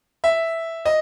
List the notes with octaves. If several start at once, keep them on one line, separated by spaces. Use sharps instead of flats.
E5
D#5